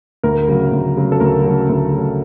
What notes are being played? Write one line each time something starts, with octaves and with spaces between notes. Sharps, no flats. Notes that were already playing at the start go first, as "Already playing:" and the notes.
D2 A#4
C#3 F#3
D2
C#3 F#3
A4
D2 A#4
C#3 F#3
D2
C#3 F#3